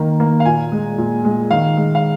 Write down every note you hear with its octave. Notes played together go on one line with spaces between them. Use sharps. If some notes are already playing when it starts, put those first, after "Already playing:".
Already playing: D#3 A#3
A#3
F5
A#2 G#5
G#3
A#2
G#3
D#3 F5
G#3
F5